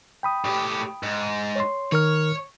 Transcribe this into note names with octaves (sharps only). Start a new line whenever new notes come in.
G5 B5 D#6
A2 G4
G#2
C#5 C6
D#3 A#4 C#5 F6